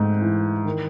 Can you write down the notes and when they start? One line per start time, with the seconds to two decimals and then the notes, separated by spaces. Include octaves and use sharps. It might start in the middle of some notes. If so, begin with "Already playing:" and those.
Already playing: G#2 A3
0.21 E3
0.65 D#3